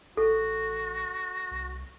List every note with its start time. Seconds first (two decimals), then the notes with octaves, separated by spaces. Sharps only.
0.17 A1 F#4 A4
1.51 C2